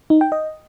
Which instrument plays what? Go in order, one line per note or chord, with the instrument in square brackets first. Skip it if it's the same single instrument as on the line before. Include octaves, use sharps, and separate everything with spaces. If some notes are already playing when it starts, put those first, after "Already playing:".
[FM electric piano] D#4
G5
D#5